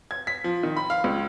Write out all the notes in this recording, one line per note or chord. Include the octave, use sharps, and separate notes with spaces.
G#6
B6
F3
D#3
B5
F5
C#2